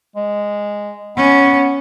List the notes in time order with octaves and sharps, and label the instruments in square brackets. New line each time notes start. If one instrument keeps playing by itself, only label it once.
[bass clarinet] G#3
[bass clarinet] B3 [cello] C#4